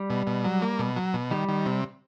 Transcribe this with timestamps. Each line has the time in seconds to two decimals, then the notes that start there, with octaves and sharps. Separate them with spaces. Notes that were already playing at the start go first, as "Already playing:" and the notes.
Already playing: G3
0.10 B2
0.27 B2
0.44 F#3
0.62 A#3
0.79 B2
0.96 F#3
1.14 B2
1.31 D#3 G3
1.48 D#3
1.66 C3